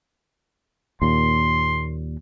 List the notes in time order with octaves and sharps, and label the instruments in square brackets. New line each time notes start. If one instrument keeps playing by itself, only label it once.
[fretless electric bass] D#2 A#2 [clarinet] C6